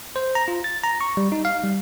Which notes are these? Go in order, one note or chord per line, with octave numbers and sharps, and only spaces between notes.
C5
A#5
F4
A6
A#5
C#6
G3
D#4
F5
G3